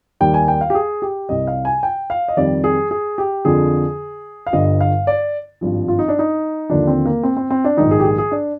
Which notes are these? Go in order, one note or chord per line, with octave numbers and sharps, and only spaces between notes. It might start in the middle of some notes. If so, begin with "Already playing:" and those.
D#2 D#3 G3 G5
G#5
G5
F5
G4
G#4
G4
C2 C3 G3 D#5
F5
G#5
G5
F5
D#5
F2 D#3 G3 D5
G#4
G#4
G4
F2 D3 F3 G#4
F5
G1 G2 D3 D#5
F5
D5
G#1 G2 F3
F4
D#4
D4
D#4
D#2 D3 F3 D4
C4
A#3
C4
C4
C4
D4
A#1 G#2 D#3 D#4
G#4
G4
G#4
G#4
D4